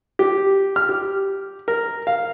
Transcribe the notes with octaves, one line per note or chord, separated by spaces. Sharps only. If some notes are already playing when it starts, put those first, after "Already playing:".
G4
F6
G4
A#4
F5